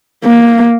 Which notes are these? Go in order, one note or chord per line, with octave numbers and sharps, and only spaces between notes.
A#3